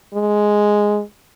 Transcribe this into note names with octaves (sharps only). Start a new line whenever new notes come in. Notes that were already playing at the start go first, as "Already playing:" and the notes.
G#3